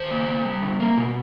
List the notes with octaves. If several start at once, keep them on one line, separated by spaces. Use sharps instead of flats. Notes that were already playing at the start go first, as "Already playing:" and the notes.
Already playing: D#3 C5
A#3
A#3
G3
D3
A#3
B2